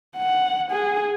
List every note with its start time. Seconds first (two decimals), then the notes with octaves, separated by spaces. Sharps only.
0.16 F#5
0.71 G#4